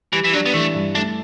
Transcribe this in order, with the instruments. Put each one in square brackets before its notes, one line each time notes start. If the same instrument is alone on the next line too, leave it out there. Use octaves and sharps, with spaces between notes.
[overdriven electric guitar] E3 [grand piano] G3
[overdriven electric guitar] E3
[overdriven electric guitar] F#3 [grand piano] D4
[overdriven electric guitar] B3
[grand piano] E3 [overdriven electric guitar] A3
[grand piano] G2
[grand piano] A3 [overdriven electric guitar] D4